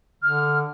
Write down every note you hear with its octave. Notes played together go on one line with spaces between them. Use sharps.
D3 F6